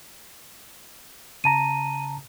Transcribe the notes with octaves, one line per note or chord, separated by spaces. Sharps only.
C#3 A5 A#5 D#7